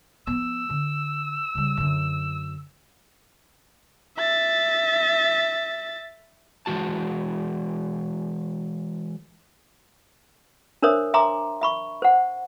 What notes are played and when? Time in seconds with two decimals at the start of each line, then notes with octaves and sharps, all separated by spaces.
0.27 F3 B3 E6
0.69 D3
1.55 C#3 G3
1.77 F#2 D3
4.17 E5 A6
6.66 E3 G#3 F#4 A5
10.82 D4 A#4 C5 C#5 E5 D#6
11.14 E5 G#5 A#5 C6 D6
11.61 E5 B5 C#6
12.02 C5 F#5